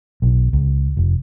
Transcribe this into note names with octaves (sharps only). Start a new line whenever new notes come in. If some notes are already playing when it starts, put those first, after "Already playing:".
B1
C#2
F1